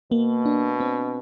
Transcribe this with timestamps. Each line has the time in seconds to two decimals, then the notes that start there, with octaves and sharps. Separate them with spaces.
0.11 B2 A#3
0.46 D4
0.80 C4